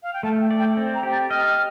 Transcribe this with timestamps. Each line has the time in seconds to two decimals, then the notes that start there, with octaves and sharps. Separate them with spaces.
0.03 F5
0.14 G5
0.23 A3 A5
0.41 G5
0.51 D5
0.59 G5
0.77 C4
0.95 A#5
1.03 G4
1.12 A6
1.30 D#5 F6